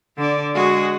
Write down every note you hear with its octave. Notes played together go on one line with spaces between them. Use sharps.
D3 D5
G#3 F#4 G#4